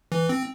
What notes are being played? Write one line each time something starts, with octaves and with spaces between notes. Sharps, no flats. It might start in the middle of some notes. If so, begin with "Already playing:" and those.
E3
C4